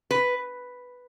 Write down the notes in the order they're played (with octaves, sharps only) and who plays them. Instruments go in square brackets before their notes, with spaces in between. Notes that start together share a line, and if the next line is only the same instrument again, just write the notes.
[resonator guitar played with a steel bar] B4